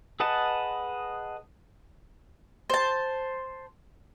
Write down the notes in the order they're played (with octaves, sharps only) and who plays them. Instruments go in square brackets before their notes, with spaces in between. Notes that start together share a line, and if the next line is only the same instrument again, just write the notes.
[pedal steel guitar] G#4 B4 D#5 F#5 A5
[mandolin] C5 A5